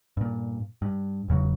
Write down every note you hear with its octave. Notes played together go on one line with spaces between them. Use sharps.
G2 A#2
G2
E1 E2 C#3 F#3